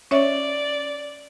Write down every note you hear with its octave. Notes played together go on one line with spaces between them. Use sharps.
C#4 C#5 D5 E5